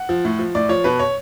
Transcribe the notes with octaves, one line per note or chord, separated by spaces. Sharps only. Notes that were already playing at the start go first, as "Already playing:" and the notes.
Already playing: F#5
F3
A2
F3
A2 D5
F3 C#5
B2 B4
C#5